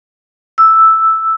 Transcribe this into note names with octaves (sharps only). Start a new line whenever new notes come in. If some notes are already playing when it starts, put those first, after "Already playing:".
E6